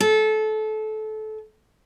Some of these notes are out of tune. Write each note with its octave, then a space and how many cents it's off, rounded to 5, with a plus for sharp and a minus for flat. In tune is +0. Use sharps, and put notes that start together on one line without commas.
A4 -25